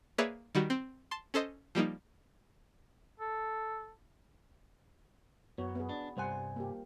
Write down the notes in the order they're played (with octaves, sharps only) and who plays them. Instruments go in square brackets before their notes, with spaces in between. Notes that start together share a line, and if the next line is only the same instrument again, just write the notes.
[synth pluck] A#3 G#4 B4 C#5 D5 E5
D#3 G3 F#4
C4
A5 C6
C#4 A4 C5 D#5
F3 G3 A#3 D#4
[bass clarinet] A4
[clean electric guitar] F#2 [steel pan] B3 F#4 C#5
[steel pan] B3 G#4
[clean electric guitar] D4
[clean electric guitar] C2 G2 G#5 [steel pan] G3 C5 F#5
[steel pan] A#3 G4